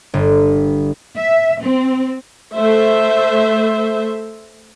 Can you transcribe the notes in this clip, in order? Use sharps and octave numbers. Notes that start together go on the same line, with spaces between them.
G1
E5
C4
A3 C5 E5